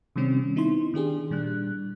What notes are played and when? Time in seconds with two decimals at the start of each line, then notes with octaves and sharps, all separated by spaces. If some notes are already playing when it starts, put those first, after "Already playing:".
0.16 C3 D#3 G3 C4 C#4
0.56 B3 D#4 E4 C6
0.94 D#3 D4 G4 G#4
1.30 A#2 G3 D4 F#6